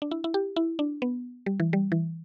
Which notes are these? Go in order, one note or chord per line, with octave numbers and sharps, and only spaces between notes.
D4
E4
E4
G4
E4
D4
B3
G3
E3
G3
E3